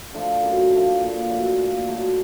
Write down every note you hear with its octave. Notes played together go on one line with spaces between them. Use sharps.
D3 F3 A3
F#2
D3 F3 A3
A#2
F#3 A3
A#2
F#3 A3